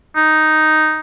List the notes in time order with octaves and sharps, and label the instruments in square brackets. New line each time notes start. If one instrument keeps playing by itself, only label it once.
[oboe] D#4